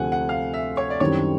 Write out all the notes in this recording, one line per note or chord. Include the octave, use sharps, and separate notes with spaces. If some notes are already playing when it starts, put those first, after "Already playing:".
Already playing: D2 C3 F3 A3 C4 F#5 G#5
F#5
F5
E5
C#5
D5
F#2 D#3 G3 C4 E4 C#5